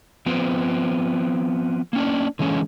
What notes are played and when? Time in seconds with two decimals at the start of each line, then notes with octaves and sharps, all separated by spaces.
0.26 F3 B3 C4
1.93 A#3 C#4 D4
2.39 D3 E3 G#3 A#3 C#4